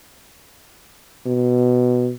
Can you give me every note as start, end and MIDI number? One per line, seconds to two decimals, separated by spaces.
1.26 2.12 47